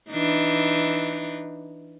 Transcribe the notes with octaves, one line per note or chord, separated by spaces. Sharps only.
E3 D4 D#4